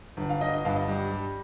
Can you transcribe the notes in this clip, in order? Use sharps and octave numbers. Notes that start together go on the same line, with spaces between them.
G1
F5
G1 D#5
D#5
G2 F5
D#5
G3
G3